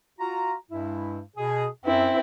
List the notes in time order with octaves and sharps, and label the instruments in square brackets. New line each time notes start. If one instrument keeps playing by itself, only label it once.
[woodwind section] F4 F#4 A#5
G2 G#3 E4
B2 G#4
[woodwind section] F#2 [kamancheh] C4 E4